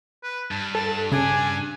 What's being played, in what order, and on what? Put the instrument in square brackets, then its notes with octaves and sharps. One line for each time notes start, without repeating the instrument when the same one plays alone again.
[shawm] B4
[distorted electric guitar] G2 [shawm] A5
[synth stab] A4 [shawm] A5
[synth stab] C#3 [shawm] D4 [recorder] G#5